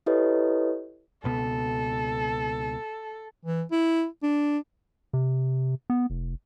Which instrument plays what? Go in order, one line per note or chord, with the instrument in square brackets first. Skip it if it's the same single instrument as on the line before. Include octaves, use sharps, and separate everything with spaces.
[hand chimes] E4 G4 A4 B4 C#5 D#5
[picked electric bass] C#2 B2 B3 [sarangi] A4
[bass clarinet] E3
E4
D4
[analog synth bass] C3
B3
F1